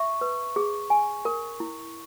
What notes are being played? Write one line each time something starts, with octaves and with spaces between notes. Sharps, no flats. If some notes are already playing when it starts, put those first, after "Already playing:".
Already playing: E5 C#6
B4
G#4
G#5
A#4
E4